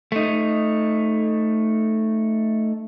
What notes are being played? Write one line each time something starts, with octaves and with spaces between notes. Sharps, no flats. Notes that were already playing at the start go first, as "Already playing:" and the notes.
A3 D#4